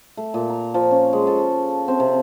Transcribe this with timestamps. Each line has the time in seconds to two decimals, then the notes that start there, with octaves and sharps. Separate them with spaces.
0.17 A3
0.34 A#2
0.50 A#5
0.74 F3
0.91 C#4
1.13 G#3
1.27 A4
1.88 C4
2.00 C3